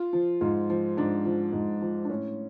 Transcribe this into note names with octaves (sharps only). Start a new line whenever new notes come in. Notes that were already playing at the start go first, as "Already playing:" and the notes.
Already playing: F4
F3
G#2 F4
F3
G#2 D4
F3
G#2
F3
D4
A2 C#4